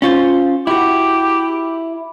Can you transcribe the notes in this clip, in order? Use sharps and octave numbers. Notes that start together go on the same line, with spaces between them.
C#4 F4 C5
E4 F#4 G4